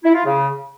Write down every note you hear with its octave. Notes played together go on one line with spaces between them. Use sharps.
E4
F4
C#3